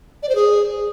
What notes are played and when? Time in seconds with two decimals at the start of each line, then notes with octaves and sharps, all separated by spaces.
0.23 D5
0.29 C5
0.35 G#4